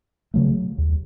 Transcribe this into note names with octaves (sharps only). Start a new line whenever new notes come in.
C#3 F#3 A3
D#2